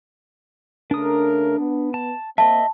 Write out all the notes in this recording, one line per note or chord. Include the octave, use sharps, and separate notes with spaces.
C#3 A3 D4 A#4 D#6
B3
A5
A#3 C4 D#5 E5 A5